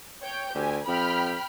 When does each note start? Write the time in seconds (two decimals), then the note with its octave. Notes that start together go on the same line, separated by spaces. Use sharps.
0.22 C#5 G5 G6
0.54 D2 G4 G#5
0.88 F2 G5 B5 F6